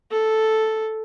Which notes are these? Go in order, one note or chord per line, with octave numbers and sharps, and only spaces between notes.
A4